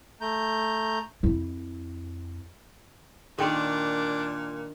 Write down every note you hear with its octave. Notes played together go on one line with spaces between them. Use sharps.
A3 A#5 G6
F2 E4
A#2 D#3 D4 A4 G5 C6